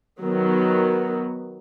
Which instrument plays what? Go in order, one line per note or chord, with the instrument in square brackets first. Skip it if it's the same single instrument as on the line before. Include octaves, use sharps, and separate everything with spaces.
[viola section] D#3 F#3 B3